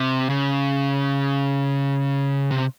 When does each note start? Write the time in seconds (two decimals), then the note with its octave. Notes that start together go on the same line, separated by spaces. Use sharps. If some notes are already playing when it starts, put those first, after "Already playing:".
Already playing: C3
0.30 C#3
2.51 C3